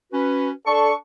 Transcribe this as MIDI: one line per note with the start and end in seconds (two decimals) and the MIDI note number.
0.13 0.50 61
0.13 0.50 66
0.13 0.50 71
0.66 0.91 62
0.66 0.91 69
0.66 0.93 85